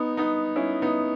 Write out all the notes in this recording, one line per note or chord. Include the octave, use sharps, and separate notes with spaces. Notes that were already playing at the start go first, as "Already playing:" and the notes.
Already playing: B3 D#4
B3 D#4
C#4 E4
B3 D#4